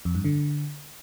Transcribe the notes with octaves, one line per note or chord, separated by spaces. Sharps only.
F2
G2
D3